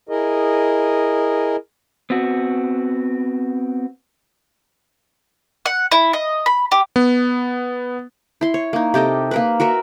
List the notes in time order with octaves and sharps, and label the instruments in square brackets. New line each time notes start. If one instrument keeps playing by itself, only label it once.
[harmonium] E4 G#4 A#4 D#5
[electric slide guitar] B3 C4 F#4
[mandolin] F#5
E4
D#5
B5
G4
[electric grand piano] B3
[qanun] E4 C6
C#5
A#3 D#4
C3 G4 A4 D#5
A#3 A#4 B4
F#4 A#4 B4 E5